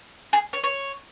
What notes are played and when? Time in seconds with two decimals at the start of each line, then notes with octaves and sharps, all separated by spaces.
0.33 G#4
0.53 C#5
0.64 C#5